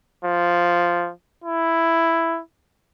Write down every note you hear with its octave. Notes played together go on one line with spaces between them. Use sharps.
F3
E4